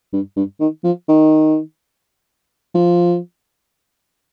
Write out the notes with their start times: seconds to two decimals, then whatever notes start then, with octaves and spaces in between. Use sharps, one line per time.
0.13 G2
0.36 G2
0.60 D#3
0.84 F3
1.08 D#3
2.75 F3